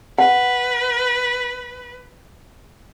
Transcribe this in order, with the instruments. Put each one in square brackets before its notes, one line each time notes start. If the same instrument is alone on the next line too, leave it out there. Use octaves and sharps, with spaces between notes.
[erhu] B4 [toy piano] F#5